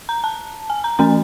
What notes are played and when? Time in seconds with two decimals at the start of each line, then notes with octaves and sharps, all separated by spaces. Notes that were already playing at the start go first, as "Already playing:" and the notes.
0.09 A#5
0.24 A5
0.70 G#5
0.84 A#5
0.99 E3 A3 C#4 A#5